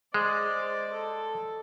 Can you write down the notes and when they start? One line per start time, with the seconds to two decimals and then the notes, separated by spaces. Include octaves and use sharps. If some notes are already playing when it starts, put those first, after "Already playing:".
0.14 G#3 C5 D5 D#5
0.93 A4